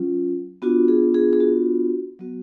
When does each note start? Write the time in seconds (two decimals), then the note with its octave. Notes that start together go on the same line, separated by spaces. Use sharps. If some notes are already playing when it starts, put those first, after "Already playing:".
Already playing: F#3 C#4 F4
0.62 B3 D4 F4 F#4
0.88 G#4
1.14 G#4
1.33 G#4
1.40 F#4
2.19 F#3 B3 F#4